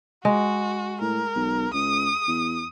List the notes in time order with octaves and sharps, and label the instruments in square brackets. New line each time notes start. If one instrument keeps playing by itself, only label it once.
[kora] G#3 [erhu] F#4
[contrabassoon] A2 [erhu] A#4
[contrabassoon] B1
[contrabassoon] C#2 [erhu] D#6
[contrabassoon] E2